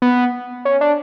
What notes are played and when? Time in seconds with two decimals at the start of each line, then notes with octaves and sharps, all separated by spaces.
0.02 B3
0.65 C#4
0.81 D4